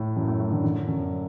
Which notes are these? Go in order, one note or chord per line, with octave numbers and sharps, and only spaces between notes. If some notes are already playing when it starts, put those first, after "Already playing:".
Already playing: A2
F#2
A2
A2
D3
D3
F#2